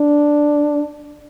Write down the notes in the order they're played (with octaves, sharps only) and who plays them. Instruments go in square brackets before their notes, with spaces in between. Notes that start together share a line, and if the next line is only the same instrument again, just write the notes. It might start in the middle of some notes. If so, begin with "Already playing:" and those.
Already playing: [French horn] D4